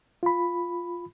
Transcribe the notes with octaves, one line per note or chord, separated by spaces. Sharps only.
F4 B5